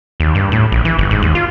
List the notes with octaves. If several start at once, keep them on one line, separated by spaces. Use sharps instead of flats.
D#2
G2
A2
A#1
E3
G1
G#2
D#2
F4